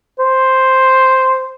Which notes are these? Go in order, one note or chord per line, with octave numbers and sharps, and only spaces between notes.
C5